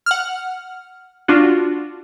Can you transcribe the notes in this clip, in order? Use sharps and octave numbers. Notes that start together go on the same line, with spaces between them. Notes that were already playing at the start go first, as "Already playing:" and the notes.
F#5 F6
D4 F4 F#4